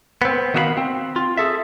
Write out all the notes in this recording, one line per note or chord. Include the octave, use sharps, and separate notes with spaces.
B3 C4
D#3 B3 F#4 E5 F5 B5
C4
F4
G#4 A4 E5